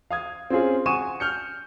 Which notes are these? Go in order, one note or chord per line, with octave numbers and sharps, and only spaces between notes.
F5 D#6 G#6
C4 C#4 F4 G#4
F#5 G#5 C#6 D#6 D#7 E7
F6 G6 C#7